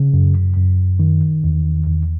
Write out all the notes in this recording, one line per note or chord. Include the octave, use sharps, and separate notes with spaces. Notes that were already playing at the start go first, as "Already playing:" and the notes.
Already playing: C#3
F#2
F#2
D#3
E2
E2